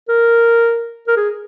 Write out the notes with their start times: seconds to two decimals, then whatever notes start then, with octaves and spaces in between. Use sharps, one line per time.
0.09 A#4
1.07 A#4
1.17 G#4